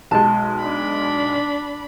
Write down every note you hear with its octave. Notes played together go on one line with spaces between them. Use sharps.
B1 G#3 A5
D4 B5